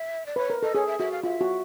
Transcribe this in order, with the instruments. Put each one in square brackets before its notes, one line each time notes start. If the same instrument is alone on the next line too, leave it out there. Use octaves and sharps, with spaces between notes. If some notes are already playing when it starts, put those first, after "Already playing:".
Already playing: [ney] E5
D5
[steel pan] B4 [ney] C#5
[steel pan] A#4
[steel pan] A4 [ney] D#5
[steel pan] G#4 [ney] C#5
[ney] E5
[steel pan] F#4 [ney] E5
[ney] F5
[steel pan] F4 [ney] E5
[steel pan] F#4